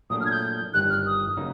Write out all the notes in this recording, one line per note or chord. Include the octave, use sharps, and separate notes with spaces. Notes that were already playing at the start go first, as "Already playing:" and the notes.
A#2 F#3 A3 D4 D#6
F6
G#6
G6
G1 G2 D#3 G3 F#6
F6
D#6
C#3 F#3 A#3 D#4